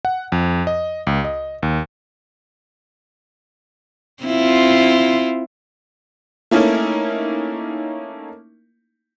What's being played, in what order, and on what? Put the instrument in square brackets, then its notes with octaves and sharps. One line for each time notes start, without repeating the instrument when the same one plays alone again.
[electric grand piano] F#5
F2
D#5
C#2
D#5
D#2
[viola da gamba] C4 E4 F4
[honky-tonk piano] A3 A#3 C#4 D#4 E4